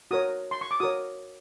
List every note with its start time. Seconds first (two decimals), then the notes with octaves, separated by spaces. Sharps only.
0.11 F#4 A#4 C#5 D#6
0.51 C6
0.61 C#6
0.71 D6
0.80 F#4 A#4 C#5 D#6